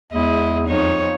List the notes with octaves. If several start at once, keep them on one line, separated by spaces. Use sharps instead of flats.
E2 G#3 E4 D#5
F2 D#4 C#5